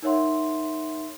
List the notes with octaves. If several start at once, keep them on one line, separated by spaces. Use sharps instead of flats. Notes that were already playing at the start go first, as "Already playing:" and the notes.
D#4 A#4 C#5 E5 F#5 C6